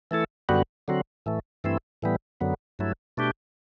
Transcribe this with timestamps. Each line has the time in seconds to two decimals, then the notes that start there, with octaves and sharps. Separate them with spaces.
0.11 E3 A3 E4 A4
0.49 F#2 D3 G3 B3 F#4
0.88 D3 F#3 C4 F#4
1.26 A2 E3 A3
1.64 G2 E3 A3 C4 E4
2.02 A2 E3 G3 B3
2.41 F#2 D3 F#3 B3
2.79 G2 F#3 A3 E4
3.17 B2 A3 D4 G4